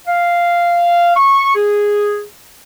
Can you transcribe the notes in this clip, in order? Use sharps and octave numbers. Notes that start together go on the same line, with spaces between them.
F5
C#6
G#4